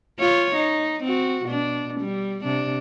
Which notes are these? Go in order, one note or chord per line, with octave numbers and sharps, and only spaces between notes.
F4 C#5
D#4
C4 F#4
B2 D4
G3
C3 D4